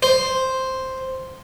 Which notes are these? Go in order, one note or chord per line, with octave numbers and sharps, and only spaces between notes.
C5